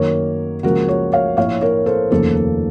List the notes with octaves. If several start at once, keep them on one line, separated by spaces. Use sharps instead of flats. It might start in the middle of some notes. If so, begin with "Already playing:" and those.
Already playing: F#2 D#3 F#3 A#3 A#4 C#5
C#2 C#3 F3 A#3 F#4 A#4
A#4 C#5
C#5 F5
A#1 A2 A3 C#5 F5
A#4 C#5
A4 C5
F1 D#2 C#3 F3 A#3 A4